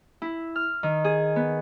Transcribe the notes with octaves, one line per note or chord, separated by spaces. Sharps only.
E4
F6
D#3
G#4
B3